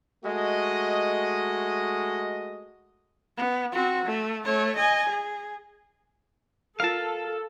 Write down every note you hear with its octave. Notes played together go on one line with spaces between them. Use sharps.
G#3 A3 F#4 D#5
B3
C4 F#4
A3
A3 C#5
D#5 G#5
G#4
F4 A4 A#4 F5 A5